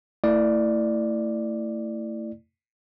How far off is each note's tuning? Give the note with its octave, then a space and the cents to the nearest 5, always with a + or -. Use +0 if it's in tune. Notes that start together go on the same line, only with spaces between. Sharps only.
A3 +30 E4 +0 D5 +10